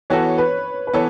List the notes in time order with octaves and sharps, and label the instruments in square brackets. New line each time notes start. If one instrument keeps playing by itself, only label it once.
[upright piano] E3 B3 F#4 A4 [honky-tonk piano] C#5
[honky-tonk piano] B4
B4
[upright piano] E3 B3 A4 [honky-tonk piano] C#5